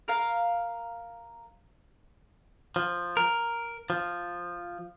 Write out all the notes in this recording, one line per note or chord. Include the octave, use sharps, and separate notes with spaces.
A#4 F5
F3
A#4
F3